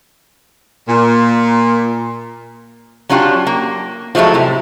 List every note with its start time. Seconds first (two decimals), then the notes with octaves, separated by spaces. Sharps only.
0.88 A#2
3.09 F#3 C#4 D4 F4 G4
3.47 A#3
4.15 F3 F#3 G#3 A3 E4
4.34 A2 C3